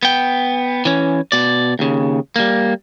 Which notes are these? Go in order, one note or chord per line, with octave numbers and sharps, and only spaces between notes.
B3 G5
E3 C#4
B2 D5
D#2 C#3
G3 A#3